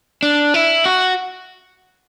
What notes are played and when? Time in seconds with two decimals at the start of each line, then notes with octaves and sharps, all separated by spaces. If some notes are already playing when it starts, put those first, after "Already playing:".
0.23 D4
0.54 E4
0.86 F#4